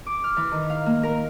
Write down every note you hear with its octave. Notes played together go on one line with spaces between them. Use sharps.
D6
F6
E3
D#3
F5
A#3
A#4